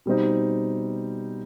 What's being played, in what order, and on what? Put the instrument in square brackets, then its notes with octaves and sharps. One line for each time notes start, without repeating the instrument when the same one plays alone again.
[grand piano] B2 G3 C4 D#4